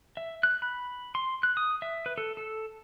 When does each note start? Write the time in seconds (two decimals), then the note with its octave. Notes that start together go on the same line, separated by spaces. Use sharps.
0.17 E5
0.43 F#6
0.62 B5
1.15 C6
1.43 F#6
1.57 D#6
1.82 E5
2.06 B4
2.18 A4
2.37 A4